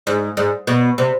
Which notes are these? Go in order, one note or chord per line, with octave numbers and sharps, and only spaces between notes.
G#2
G#2
B2
C3